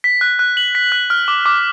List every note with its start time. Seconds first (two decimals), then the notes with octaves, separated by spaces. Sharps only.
0.04 B6
0.21 F#6
0.39 F#6
0.57 F#7
0.75 B6
0.92 F#6
1.10 F6
1.28 D6
1.46 D6